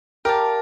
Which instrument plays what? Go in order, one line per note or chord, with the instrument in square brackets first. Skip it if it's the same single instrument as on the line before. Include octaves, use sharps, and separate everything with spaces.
[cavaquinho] G4 D5 F5 A5 [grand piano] A#4